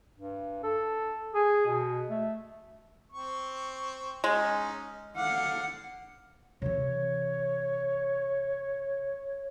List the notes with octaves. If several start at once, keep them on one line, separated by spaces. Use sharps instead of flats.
G2
A4
G#4
B2
A3
C4 C#6
G#3 C#4 D#4
D3 F5 F#5 D6
C3 E3 C#5